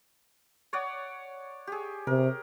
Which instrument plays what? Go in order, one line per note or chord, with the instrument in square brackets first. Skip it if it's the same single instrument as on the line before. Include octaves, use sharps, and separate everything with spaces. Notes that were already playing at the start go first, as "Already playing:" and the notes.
[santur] C#5 D5 F#5
G4 G#4
[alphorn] C3 [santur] A#4